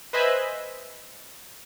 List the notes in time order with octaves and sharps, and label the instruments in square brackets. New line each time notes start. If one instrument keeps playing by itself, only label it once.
[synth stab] B4 C5 D#5 E5 G#5 B5